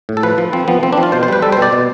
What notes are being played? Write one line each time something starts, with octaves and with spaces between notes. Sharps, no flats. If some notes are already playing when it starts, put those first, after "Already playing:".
A2
A4
F3 B4
F3
F3 C4
F3 B3
F3 C4
D4
F3
F4
B2 C5
C5
G3 B4
G3 A4
C5
B2
D5
B2